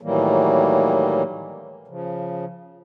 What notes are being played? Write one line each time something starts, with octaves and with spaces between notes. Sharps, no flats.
A2 D#3 E3 F#3 G3 A#3
C#3 F3